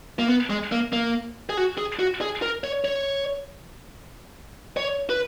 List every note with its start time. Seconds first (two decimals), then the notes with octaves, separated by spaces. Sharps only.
0.19 A#3
0.28 B3
0.50 G#3
0.72 A#3
0.93 A#3
1.50 G#4
1.57 F#4
1.78 G#4
1.99 F#4
2.21 G#4
2.42 A#4
2.64 C#5
2.85 C#5
4.77 C#5
5.10 B4